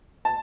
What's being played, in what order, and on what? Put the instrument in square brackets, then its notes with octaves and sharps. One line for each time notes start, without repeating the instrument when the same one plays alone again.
[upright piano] A5